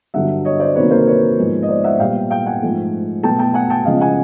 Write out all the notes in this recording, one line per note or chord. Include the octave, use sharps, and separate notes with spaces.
G2 D3 F#3 E5 F#5
C#5 D#5
C5 D5
C3 D#3 F#3 A#3 B4 C#5
A#4 C5
B4 C#5
G#2 F3 G#3 B3
D#5
C5 D5
E5 F#5
A#2 G3 B3 F5 G5
F5 G5
F#5 G#5
G#2 F3 A3
B2 F#3 A3 G5 A5
G5 A5
F#5 G#5
G5 A5
C#3 F3 G#3 D#5 F5
F#5 G#5